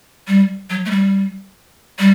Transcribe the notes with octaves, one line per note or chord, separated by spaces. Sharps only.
G3
F#3
A3
G3
G3